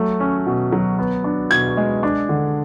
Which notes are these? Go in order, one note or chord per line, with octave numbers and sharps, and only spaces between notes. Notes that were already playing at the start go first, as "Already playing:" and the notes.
Already playing: F#3 A3
C#4
B2
F#3
B3
D4
B2 G#6
G#3
D4
D3